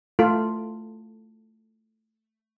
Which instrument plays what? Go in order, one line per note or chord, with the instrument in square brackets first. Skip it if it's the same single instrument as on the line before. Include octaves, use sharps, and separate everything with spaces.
[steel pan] A3 F4 A4